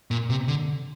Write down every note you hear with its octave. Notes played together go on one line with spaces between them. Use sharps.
A#2
C3
D3